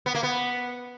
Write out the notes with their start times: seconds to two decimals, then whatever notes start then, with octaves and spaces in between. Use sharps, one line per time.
0.06 B3
0.15 A#3
0.23 B3